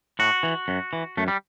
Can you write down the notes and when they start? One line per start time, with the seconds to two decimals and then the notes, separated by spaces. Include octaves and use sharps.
0.19 A2 F#4
0.43 E3
0.68 F#2
0.93 E3
1.17 F#2 A3
1.28 G3